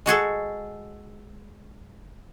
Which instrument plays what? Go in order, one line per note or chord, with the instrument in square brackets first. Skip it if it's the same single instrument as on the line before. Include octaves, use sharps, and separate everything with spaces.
[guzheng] G#3 F#4 G#4 A4